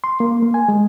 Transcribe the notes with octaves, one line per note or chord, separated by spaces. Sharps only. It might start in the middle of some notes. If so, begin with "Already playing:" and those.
C6
A#3
A#3
G#5
G#3